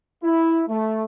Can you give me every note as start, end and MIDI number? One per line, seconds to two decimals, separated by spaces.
0.24 0.62 64
0.68 1.03 57